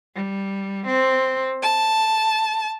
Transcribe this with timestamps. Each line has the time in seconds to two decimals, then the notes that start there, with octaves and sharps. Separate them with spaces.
0.15 G3
0.87 C4
1.62 A5